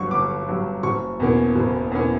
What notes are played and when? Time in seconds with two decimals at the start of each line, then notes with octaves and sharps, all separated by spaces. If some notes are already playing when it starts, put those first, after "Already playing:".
Already playing: G1 G2 F#3 C#6
0.11 G1 D6
0.47 G2 F#3
0.83 F#1 C#6
1.20 E2 B2 A#3 C#4
1.56 F#1
1.92 E2 B2 A#3 C#4